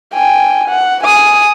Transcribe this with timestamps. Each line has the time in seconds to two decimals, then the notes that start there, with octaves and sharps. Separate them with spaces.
0.14 G5 G#5
0.69 F#5
1.04 G#5 D#6